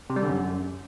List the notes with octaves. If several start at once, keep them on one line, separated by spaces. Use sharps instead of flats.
C3
G3
D3
F#2